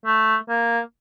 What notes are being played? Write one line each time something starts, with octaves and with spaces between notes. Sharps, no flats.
A3
A#3